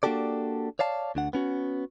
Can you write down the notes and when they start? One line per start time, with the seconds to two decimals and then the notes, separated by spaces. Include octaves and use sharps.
0.03 A#3 D4 F#4 G4 A4 D5
0.79 C#5 D5 F5 A5
1.15 D2 D4 F#5
1.33 B3 C#4 F#4